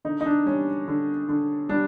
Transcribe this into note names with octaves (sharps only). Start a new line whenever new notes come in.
D3 D#4
D#4
D4
G3 C#4
D3
D3
G3 D4